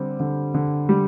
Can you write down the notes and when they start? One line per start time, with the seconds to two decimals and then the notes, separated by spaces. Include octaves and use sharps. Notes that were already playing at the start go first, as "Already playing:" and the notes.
Already playing: D3 G3 C4
0.20 D3
0.54 D3
0.89 G3